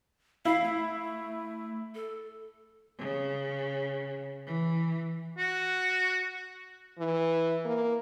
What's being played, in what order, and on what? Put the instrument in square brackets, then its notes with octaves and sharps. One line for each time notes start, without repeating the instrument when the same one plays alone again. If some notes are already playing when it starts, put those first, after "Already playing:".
[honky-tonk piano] E4 [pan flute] F5
[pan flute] A3
A4
[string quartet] C#3
E3
[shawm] F#4
[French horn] E3
A#3